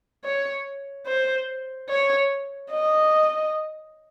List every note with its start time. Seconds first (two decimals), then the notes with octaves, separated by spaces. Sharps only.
0.24 C#5
1.06 C5
1.89 C#5
2.71 D#5